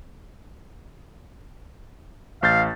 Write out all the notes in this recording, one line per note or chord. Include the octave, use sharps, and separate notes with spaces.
A1 F5 G6 A6